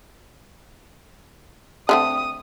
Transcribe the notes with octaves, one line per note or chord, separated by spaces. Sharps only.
D3 A3 C4 D#6